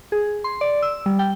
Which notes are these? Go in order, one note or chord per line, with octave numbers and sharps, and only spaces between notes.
G#4
C6
D5
E6
G3
G5